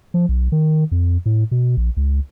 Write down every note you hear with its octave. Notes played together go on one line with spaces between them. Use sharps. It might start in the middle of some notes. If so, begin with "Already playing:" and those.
F3
B1
D#3
F2
A2
B2
A#1
C#2